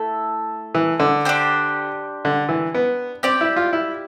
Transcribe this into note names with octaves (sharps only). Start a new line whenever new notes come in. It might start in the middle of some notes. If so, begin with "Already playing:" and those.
Already playing: A3 E4 A4
E3
D3
D4 G4 C5
D3
E3
B3
C4 G4 D5 G5
E4
F4
E4